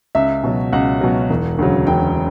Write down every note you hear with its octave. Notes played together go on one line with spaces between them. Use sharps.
C#2 E5
B2 F#3
C#2 F#5
B2 F#3
E1
D2 C#3 F#3
E1 G5